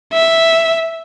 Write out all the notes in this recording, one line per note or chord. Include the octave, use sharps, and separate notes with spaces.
E5